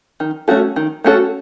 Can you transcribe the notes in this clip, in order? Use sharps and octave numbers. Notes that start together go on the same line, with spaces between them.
D#3
A3 C#4 F#4 A4
D#3
A3 C#4 F#4 A4